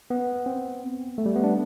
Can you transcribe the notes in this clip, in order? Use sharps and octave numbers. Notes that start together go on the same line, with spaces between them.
B3
C4
A3
G3
B3
D4